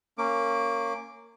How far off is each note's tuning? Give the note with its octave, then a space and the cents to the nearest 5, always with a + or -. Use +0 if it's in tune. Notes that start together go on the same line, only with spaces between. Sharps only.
A#3 -15 C#4 +0 D6 +0